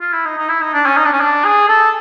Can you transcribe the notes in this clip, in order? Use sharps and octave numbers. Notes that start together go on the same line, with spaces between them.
F4
E4
D#4
D#4
E4
D#4
D4
C#4
D#4
D4
C#4
D4
G#4
A4